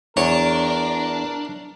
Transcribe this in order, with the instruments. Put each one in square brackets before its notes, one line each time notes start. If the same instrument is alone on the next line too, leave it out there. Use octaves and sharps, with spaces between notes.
[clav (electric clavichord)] E2 [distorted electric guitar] D4 [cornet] A#4 [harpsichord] C#5